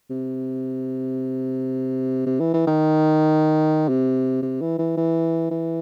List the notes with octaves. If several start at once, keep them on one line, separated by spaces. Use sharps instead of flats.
C3
C3
E3
E3
D#3
C3
C3
E3
E3
E3
E3